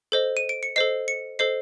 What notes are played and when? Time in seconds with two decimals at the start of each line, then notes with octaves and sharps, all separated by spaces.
0.12 A4 C5 D#5
0.37 D#7
0.49 D7
0.63 C#7
0.76 A4 C5 D#5 C7
1.08 C#7
1.39 A4 C5 D#5 C7